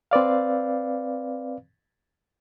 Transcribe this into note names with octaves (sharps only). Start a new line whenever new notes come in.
C4 B4 D5 F5